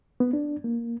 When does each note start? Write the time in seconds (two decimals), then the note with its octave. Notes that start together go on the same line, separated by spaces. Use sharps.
0.20 B3
0.33 D4
0.64 A#3